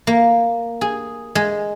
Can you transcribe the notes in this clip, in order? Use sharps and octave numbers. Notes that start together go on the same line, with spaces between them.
A#3
G#4
G#3